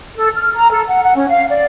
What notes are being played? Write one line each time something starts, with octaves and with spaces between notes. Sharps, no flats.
A4
F6
A#5
A4
F#5
F#5
C#4
F5
D5